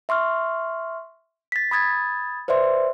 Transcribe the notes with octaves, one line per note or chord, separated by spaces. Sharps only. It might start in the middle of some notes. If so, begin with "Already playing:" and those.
E5 C6 C#6 F6
A6 B6
B5 D#6 G#6 A6
B4 C5 D5 E5 C6